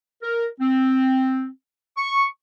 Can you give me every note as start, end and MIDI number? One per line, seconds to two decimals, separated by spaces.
0.23 0.47 70
0.60 1.48 60
1.97 2.25 85